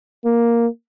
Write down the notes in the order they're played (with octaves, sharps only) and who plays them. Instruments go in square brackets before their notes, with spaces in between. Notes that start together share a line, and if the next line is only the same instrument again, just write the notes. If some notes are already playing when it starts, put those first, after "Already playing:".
[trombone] A#3